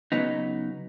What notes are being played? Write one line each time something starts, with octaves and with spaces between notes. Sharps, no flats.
C#3 F#3 B3 D#4